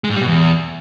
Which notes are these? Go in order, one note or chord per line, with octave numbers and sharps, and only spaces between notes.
G#3
G#2
G3
B2
E2